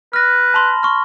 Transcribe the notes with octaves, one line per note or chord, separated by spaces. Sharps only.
B4 F6 A#6
A5 B5 C6
C6 C#6 F6